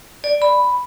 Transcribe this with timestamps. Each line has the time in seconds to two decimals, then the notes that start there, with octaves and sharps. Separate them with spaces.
0.24 D5
0.42 B5